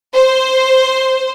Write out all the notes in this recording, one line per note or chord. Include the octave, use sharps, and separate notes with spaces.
C5